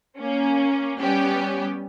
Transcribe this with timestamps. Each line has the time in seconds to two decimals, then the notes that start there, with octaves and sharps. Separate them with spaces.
0.17 A#3 C#4
1.00 G3 B3 C#4 G4